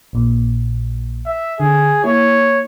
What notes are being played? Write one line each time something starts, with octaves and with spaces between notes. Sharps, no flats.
A#1 A#2
E5
D3 G#4
A#3 E4 C#5